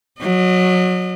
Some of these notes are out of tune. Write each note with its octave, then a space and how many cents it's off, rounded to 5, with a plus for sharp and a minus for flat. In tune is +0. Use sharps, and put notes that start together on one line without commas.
F#3 -20 D#5 -35